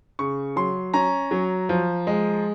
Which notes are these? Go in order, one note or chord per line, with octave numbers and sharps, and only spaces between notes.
C#3 C#6
F#3 C6
C#4 A#5
F#3
F3
G#3